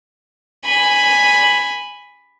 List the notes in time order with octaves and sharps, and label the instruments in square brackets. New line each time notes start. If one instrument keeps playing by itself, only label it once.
[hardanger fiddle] G#5 B5